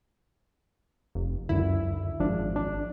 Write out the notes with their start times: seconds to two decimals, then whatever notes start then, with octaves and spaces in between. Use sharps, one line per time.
1.15 F1
1.49 C#2 F#2 D3 E4
2.20 G#1 F3 D4
2.56 D4